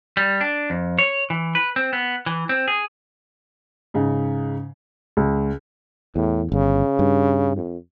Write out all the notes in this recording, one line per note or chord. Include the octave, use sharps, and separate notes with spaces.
G3
D4
F2
C#5
E3
B4
C4
B3
E3
C4
G#4
G#2 C#3
C#2
E2 A2
G1 C#3
G2
F2